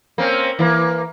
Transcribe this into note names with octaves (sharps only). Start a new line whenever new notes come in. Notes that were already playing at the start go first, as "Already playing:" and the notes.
A#3 C4 C#4
E3 A#3